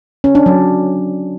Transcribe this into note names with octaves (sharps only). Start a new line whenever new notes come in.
C#4
D4
F#3